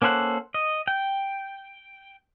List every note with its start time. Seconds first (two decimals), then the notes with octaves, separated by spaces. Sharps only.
0.02 A#3 C#4 A4 C5 F#5
0.54 D#5
0.88 G5